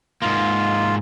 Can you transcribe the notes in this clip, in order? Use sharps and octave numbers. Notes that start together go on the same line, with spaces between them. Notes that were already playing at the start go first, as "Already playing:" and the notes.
G#2 A#3 F4